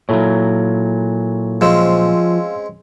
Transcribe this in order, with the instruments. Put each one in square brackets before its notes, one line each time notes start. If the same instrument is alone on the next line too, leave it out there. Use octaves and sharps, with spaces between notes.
[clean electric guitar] A#2 F#3 [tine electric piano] E4 A4 C#5
[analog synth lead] F3 [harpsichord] G#3 C4 C#4 [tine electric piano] F5 E6